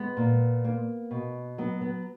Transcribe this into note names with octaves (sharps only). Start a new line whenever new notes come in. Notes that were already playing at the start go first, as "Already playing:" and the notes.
Already playing: G#3 B3
A#2
A#3
B2
F#3 B3
B3